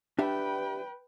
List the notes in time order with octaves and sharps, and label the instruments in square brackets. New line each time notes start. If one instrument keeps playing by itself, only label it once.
[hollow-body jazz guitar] D4 G4 E5 [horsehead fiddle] B4 G5